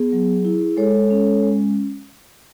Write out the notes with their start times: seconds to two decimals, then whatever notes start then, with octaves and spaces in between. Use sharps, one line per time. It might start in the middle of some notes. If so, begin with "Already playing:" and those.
Already playing: B3 G#4
0.12 F#3
0.45 E4
0.77 G#3 A4 C#5
1.10 C#4
1.43 G#3